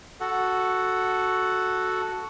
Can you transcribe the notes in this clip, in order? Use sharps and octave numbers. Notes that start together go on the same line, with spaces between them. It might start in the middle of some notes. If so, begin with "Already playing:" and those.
F#4 A4 F#5